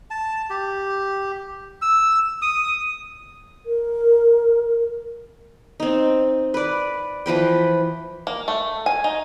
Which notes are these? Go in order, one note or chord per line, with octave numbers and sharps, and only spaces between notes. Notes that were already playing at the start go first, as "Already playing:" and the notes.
A5
G4
E6
D#6
A#4
C4 D#4
B4 D5
E3 F3 B4 G5
A#3
A3
G#5
D#4